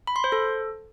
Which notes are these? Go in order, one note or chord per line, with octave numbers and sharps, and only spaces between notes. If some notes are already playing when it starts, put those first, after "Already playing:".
B5
C6
C5
A4